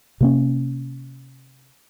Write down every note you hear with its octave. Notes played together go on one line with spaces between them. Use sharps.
C3 A#3 C#4